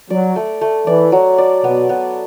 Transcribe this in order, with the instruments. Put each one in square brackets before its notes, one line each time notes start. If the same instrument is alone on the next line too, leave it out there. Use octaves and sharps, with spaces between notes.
[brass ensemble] F#3 [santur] D5
[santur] A3
A3
[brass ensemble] E3 [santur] D5
[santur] F#3
D5
[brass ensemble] B2 [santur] B3
[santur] B3